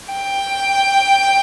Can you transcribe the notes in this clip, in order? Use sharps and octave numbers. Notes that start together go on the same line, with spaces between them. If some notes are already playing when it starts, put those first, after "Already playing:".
G5